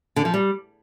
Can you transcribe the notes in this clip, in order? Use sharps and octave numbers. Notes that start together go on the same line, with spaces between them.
D3
F3
G3